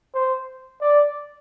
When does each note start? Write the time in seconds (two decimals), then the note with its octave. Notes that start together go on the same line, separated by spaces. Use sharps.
0.14 C5
0.81 D5